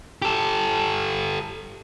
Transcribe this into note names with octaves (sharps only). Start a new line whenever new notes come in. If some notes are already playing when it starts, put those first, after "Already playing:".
G4 A4